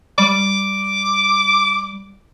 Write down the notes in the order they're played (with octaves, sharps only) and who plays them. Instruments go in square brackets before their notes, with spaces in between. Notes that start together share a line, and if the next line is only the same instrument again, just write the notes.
[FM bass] G3 [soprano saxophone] D6